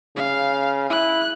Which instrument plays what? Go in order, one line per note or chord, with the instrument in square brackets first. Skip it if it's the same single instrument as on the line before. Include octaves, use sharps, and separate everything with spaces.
[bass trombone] C#3 [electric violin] F5
[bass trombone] E4 [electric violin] F#6